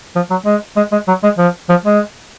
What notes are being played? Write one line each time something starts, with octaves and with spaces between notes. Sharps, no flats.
F3
F#3
G#3
G#3
G#3
F#3
G#3
F3
F3
G#3